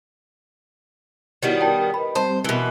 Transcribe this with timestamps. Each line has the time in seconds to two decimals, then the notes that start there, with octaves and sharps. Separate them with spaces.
1.43 D#3 G3 B3 E4 F#4 C#5
1.61 A#4 G5 A5
1.94 A#4 B4 D#5 B5
2.15 G3 C4 G4 C5 A5
2.44 B2 E3 A#4 D#5 E5